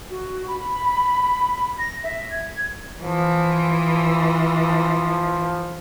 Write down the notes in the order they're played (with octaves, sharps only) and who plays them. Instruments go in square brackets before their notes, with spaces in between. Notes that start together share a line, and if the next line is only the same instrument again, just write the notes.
[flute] F#4
B5
A#6
E5
G#6
[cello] E3 [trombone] F3